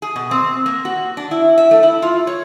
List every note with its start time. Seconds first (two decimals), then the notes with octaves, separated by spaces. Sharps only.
0.02 G#4
0.16 B2
0.31 C4
0.66 A#3
0.85 F#4
1.17 D4
1.31 E4
1.58 E5
1.71 A3
1.83 E4
2.02 F4
2.27 C#5